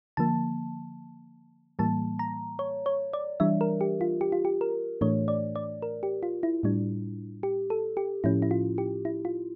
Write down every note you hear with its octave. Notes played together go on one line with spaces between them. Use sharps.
D3 F3 A#3 A5
A2 E3 G3 A#3 A5
A#5
C#5
C#5
D5
E3 G3 D4 E5
A#4
G4
F4
G4
F4
G4
A#4
A2 E3 A3 D4 C#5
D5
D5
A#4
G4
F4
E4
A2 G3 D4
G4
A4
G4
A2 F3 C#4 E4
E4
F4
G4
E4
F4